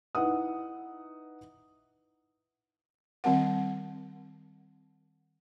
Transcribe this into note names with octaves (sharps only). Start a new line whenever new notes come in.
D#4 E4 B4 F#5 D#6
D#3 G3 C4 A#4 F#5